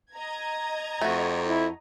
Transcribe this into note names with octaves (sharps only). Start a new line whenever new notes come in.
D#5 A#5 G#6
F2 A3 F#4
E4